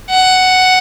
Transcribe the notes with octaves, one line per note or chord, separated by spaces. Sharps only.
F#5